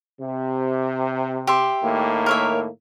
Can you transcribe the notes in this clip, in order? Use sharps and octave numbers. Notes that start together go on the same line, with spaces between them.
C3
G4 E5 C6
A2 D#3 A#3
A#4 C#5 E5